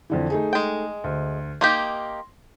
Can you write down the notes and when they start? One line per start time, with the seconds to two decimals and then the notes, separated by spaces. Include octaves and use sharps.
0.10 F2 D3 E3
0.30 A3 D#4 G#4
0.53 G#3 G5
1.04 D2
1.61 A#3 D#4 G4 C6